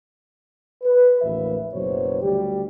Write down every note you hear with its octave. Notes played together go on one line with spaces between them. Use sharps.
B4
A1 D#2 F3 B4 E5
F#1 B2 F#3 C5 C#5
D2 G3 G4